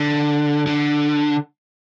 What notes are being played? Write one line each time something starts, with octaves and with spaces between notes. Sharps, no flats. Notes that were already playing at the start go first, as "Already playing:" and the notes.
Already playing: D3
D3